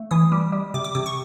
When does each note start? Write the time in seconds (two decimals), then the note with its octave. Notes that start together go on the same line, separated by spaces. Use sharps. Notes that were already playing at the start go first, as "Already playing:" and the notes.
Already playing: A3
0.11 E3 D#6
0.32 G3
0.52 G3
0.74 C3 D6
0.84 D6
0.95 C3 D6
1.06 C#6